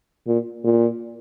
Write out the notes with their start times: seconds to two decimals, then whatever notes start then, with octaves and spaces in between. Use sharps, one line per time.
0.27 A#2
0.64 A#2